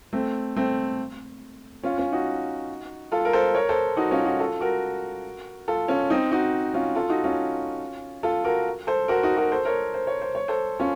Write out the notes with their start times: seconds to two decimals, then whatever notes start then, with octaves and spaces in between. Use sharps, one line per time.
0.13 A3 C4
0.56 A3 C4
1.83 C#4 F4
1.98 C#4 F4
2.12 D#4 F#4
3.12 F4 A4
3.25 A#4
3.33 A4 C5
3.54 A#4 C#5
3.69 A4 C5
3.97 D#4 F#4
4.11 C#4 F4
4.25 D#4 F#4
4.39 F4 A4
4.60 F#4 A#4
5.68 F4 A4
5.88 C#4 F4
6.10 C4 D#4
6.31 D#4 F#4
6.74 C#4 F4
6.95 F4 A4
7.09 D#4 F#4
7.24 C#4 F4
8.23 F4 A4
8.44 F#4 A#4
8.87 A4 C5
9.08 F#4 A#4
9.23 D#4 F#4
9.37 F#4 A#4
9.52 A4 C5
9.65 A#4 C#5
9.94 C5
10.07 C#5
10.22 C5
10.35 C#5
10.48 A4 C5
10.79 C#4 F4